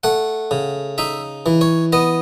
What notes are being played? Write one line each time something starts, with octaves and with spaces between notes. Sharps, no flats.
A3 F#5
C#3
D#4 E5
E3
C#5
B3 D#5